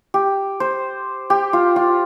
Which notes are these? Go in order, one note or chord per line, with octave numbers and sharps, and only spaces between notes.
G4
C5
G4
F4
F4